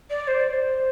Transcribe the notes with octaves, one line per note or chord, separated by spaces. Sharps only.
D5
C5
D5
C5